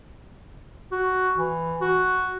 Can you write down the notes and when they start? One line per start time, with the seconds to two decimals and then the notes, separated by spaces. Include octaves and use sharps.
0.92 F#4
1.36 E3
1.81 F#4